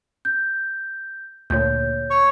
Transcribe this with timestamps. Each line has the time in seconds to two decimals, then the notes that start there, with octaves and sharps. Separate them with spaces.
0.25 G6
1.50 D2 A#2 C#5 G6
2.10 C#5 C#6